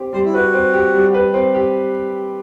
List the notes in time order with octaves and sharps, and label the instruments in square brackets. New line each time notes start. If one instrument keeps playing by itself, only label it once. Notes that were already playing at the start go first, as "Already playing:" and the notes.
Already playing: [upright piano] C4 G4
[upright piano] G3 [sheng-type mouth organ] C5
[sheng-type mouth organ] E4
[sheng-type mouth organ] F#4 [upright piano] B4
[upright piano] C4
G4
G3
B4
C4
G4